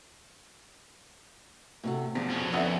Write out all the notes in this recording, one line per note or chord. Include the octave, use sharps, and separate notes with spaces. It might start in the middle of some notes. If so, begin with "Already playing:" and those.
A2 C3 F#4
E2 B2 F3
F2 C#4
D3 B3 C4 C#5 E5